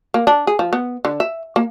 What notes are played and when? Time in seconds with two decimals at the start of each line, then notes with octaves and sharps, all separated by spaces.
0.14 A#3
0.27 D4
0.47 G#4
0.59 F3
0.73 B3
1.05 D3
1.20 E5
1.56 A#3